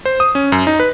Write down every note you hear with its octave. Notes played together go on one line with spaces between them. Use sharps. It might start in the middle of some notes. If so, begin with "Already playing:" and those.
C5
D#6
C#4
F#2
D#4
B4